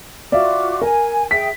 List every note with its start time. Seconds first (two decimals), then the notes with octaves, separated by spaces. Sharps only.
0.32 F4 F#4 D5 E5 F5 D6
0.82 A#4 G#5
1.31 G#4 E5 G5 B6